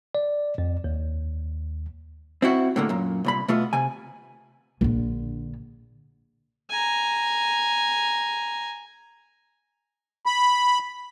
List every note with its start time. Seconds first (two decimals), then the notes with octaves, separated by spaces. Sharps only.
0.15 D5
0.58 F2
0.84 D#2
2.42 C4 E4 F#4
2.76 A2 D3 A#3
2.89 F#2 A#2
3.25 C2 A#2 B5
3.48 B2 A3 B3 F4
3.73 C3 G#5
4.81 A#1 D3
6.70 G#5 A#5
10.26 B5